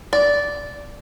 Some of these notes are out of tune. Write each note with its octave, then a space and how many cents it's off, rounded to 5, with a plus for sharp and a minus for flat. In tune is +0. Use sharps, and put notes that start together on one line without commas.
D5 -10